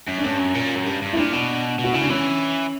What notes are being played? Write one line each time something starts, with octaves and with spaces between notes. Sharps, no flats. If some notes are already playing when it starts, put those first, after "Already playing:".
F#2
D4
G2 C#4
F#2
A#2
F#2
G2
G2
E4
A#2 D4
B2
B2
F#4
C#3 E4
D4
E3 C#4